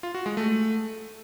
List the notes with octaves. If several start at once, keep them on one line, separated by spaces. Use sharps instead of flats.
F4
F#4
G#3
A3